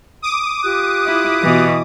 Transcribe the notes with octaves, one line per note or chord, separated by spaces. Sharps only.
D6 D#6
F4 G4 F#6
E4
B2 E3